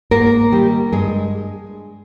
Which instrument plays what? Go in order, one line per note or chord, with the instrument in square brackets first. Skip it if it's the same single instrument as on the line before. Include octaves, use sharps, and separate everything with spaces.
[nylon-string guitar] G#2 A#3 A#4
D#3 G3
G2 G#3 G#4